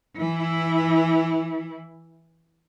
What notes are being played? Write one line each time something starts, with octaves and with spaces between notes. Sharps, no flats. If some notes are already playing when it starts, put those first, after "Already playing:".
E3 E4